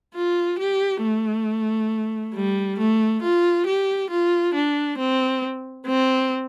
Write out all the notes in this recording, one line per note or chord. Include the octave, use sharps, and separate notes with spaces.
F4
G4
A3
G3
A3
F4
G4
F4
D4
C4
C4